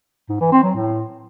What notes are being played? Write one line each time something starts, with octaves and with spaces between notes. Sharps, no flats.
G#2
E3
C4
F#3
A2